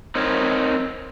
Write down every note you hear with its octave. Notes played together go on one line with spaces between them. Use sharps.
C4 D#4 A#4 C5 C#5